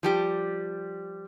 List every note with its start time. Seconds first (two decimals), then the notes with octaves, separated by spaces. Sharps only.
0.03 F3 G3 G4